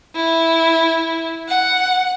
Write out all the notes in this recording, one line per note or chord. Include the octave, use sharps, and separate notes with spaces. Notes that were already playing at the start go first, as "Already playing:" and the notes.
E4
F#5